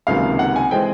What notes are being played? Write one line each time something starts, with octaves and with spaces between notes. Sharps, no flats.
C#2 C3 D#3 F#3 A#3 F5
F#5
G#5
E3 G#3 C4 G5